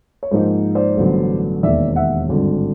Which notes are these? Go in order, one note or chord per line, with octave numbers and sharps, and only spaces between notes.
C#5
G#2 F3 A#3 D#4 C5
C5 D5
A1 G2 D3 F#3 B3
E1 D#2 D#3 D5 E5
E5 F#5
G#1 G2 D3